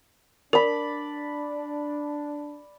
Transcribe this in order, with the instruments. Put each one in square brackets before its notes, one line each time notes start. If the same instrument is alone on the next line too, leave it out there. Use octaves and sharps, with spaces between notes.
[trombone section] D4 [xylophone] A#4 [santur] D5 B5